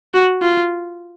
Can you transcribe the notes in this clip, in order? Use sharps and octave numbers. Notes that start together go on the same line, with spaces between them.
F#4
F4